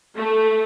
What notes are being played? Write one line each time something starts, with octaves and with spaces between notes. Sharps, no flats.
A3